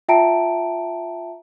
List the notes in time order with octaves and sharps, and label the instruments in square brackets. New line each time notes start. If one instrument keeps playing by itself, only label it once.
[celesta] F4 E5 G5 A5 A#5 D7